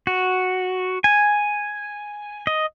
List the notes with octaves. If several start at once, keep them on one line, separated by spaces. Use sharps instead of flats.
F#4
G#5
D#5